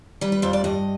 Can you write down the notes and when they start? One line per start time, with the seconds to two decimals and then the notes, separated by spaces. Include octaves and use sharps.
0.21 G3 B4
0.32 B4
0.42 F2 C5
0.53 D5
0.64 G2 D#5